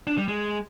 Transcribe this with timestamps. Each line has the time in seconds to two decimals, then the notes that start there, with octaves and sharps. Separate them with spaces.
0.07 D4
0.18 G3
0.28 G#3